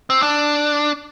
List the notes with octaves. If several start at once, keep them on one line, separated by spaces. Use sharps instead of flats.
C4
D4